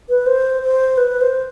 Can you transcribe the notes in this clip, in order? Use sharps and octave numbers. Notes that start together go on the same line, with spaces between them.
B4
C5
C5
B4
C5